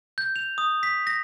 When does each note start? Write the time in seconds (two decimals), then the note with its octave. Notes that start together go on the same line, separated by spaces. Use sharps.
0.18 G6
0.36 F7
0.58 D#6
0.83 B6
1.07 A#6